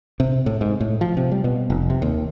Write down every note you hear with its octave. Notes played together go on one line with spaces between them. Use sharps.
C3
A2
G#2
A2
F3
C3
G3
B2
F1
C3
D#2